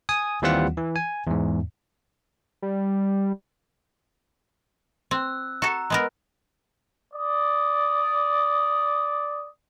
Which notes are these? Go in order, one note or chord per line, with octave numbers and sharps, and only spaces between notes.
G#5 D#6
D#2 E3 G3 C4 F4 F#5
E3
G#5
E2 G#2
G3
C4 E6 F#6
F#4 A4 A#5
G#3 B3 A#4 F#6
D5 D#6